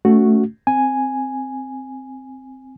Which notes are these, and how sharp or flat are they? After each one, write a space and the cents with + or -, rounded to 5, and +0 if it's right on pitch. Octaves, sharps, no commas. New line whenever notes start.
A3 +0 C#4 +30 F#4 +0
C4 +0 G#5 +0